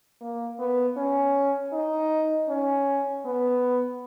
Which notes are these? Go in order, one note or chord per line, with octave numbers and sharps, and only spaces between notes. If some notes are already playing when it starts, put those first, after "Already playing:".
A#3
B3
C#4
D#4
C#4
B3